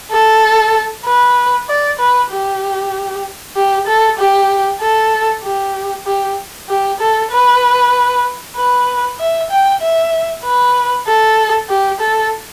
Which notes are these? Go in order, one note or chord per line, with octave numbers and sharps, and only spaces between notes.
A4
B4
D5
B4
G4
G4
A4
G4
A4
G4
G4
G4
A4
B4
B4
E5
G5
E5
B4
A4
G4
A4